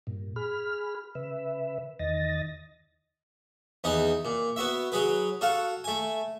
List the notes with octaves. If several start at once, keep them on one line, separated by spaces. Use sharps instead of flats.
G2 A#2
G#4 B5 F6
C#3 B4 E5
E2 D#3 D#5 A6 A#6
E2 B3 D#4 G#4
A#2
B3 F#4 E5
F#3 G#4 B4
F#4 A4 F5
A3 G#5